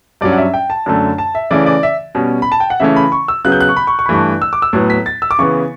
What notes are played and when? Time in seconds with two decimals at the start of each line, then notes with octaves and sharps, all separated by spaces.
0.21 G2 F#3 C#4 D5
0.32 F#5
0.38 E5
0.54 G5
0.70 A5
0.86 F#2 D3 A3
1.18 A5
1.35 E5
1.51 C#3 E3 A3 C#4 D5
1.66 D5
1.83 E5
2.15 B2 G3 C#4
2.42 B5
2.52 A5
2.60 G5
2.70 F#5
2.80 C#3 E3 A3 C#4 E5
2.96 B5
3.12 C#6
3.28 E6
3.45 C#3 F#3 B3 F#6
3.52 G6
3.61 F#6
3.69 C#6
3.77 B5
3.87 C#6
3.99 C#6
4.06 B5
4.09 G2 E3 A3 C#6
4.42 E6
4.53 D6
4.62 E6
4.73 A2 F#3 B3
4.90 B6
5.06 A6
5.22 E6
5.31 D6
5.39 C#3 E3 B3 C#6